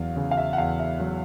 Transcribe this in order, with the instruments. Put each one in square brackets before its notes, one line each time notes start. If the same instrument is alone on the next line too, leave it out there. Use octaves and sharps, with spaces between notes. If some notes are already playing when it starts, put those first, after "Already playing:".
Already playing: [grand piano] E2 F#3 F5
C#3
F5
E5
F#5
E2 F5
E5
F#3